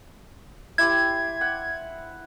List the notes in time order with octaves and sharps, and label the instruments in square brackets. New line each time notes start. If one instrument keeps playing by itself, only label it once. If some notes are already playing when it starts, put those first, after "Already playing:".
[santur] E4 G4 C5 [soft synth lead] G#6
[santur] F#5